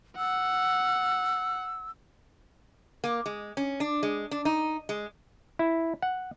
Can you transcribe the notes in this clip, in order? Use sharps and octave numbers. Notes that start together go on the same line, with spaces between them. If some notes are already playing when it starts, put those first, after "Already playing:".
F#5 E6
A#3
G#3
C#4
D4
G#3
D4
D#4
G#3
E4
F#5